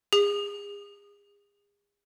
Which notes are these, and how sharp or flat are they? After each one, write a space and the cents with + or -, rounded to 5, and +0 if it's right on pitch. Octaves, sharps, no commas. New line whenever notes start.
G#4 -35